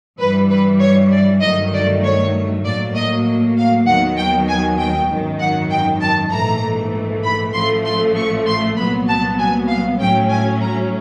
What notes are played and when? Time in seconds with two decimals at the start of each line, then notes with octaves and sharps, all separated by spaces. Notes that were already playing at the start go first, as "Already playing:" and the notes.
0.20 G2 E3 G3 B4
0.50 B4
0.80 C#5
1.12 D5
1.41 G2 D#3 F#3 A3 D#5
1.73 D5
2.03 C#5
2.65 A2 F#3 A#3 D5
2.96 D#5
3.57 F5
3.87 D#2 D#3 F#3 B3 F#5
4.18 G5
4.48 G#5
4.78 G5
5.10 G#1 F#2 D#3
5.40 F#5
5.71 G5
6.02 A5
6.32 A#1 G#2 E3 A3 A#5
7.24 B5
7.54 A1 A2 F3 A3 C6
7.85 C6
8.16 C#6
8.47 C6
8.77 C2 A#2 F#3 B3 B5
9.08 A5
9.39 G#5
9.69 F5
9.99 A2 F#3 A3 C#4 G5
10.30 G#5
10.61 A#5